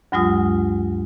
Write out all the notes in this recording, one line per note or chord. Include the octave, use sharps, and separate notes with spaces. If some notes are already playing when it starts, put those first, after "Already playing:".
D2 G2 F#3 G#3 F4 D#6